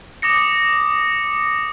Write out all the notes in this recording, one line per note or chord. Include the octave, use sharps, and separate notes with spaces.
D6 D#6 A#6 C#7